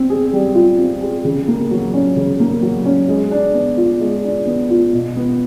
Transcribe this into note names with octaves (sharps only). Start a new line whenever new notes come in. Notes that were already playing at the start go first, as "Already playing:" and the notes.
Already playing: C4
G#4
G3
F4
C4
G#4
C#3
A#3
F#3
C#4
C#3
A#3
F#3
C#4
G#3
D4
B3
F4
G#3
D4
B3
F4
B2
B3